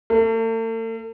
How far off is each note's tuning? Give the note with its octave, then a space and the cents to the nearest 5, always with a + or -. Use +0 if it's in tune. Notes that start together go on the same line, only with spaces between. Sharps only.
A3 +45